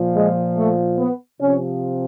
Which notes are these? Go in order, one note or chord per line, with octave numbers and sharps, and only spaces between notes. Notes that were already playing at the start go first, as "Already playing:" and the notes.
Already playing: A#2 F3
G#3
A3
B3
C3 F3 C#4